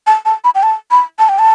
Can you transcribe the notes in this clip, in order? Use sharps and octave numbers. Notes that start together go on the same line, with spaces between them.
A5
A5
B5
G5
A5
B5
A5
G5
A5